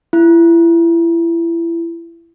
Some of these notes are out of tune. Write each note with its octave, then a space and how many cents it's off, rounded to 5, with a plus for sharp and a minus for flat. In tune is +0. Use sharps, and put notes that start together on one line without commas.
E4 +30